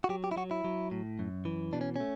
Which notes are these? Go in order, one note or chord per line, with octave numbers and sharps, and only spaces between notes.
F#4
F#3 G4
G4
E4
F#3 F#4
E4
F#3
A2
F#2
E3
B2 D4
C#4
A3 C#4